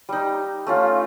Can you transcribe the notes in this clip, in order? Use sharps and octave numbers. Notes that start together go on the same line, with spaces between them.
G3 D#4
A3 C#4 F4